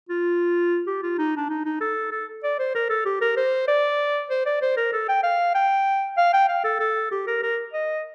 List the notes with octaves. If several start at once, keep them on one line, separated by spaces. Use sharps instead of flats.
F4
G4
F4
D#4
D4
D#4
D#4
A4
A4
D5
C5
A#4
A4
G4
A#4
C5
D5
C5
D5
C5
A#4
A4
G5
F5
G5
F5
G5
F5
A4
A4
G4
A#4
A#4
D#5